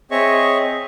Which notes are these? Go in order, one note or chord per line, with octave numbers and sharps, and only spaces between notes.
C4 G#4 C#5 D#5 E5 C#6